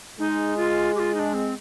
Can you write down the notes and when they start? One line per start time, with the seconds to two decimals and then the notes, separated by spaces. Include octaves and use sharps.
0.19 G#3 D#4
0.57 F4
0.95 G4
0.99 F4
1.15 D#4
1.19 D4
1.34 C4